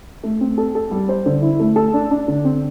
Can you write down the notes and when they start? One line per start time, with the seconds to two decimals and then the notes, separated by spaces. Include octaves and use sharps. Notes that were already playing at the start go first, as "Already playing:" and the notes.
0.23 A3
0.41 C4
0.58 A4
0.75 A4
0.91 G3
1.09 C5
1.26 D3
1.42 E4
1.60 A3
1.76 A4
1.94 D4
2.11 D4
2.28 D3
2.45 C4